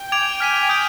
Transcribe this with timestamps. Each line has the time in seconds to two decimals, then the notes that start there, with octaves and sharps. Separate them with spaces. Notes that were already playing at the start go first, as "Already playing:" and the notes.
Already playing: G5
0.12 G#5 D6 G#6 D7 F7
0.40 F6 B6 D#7
0.69 D#6 G6 D7